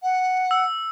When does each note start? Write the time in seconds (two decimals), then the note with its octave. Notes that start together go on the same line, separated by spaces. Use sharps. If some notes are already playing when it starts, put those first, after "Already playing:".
0.03 F#5
0.51 E6